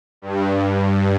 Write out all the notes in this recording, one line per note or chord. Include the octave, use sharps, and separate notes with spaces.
G2
G2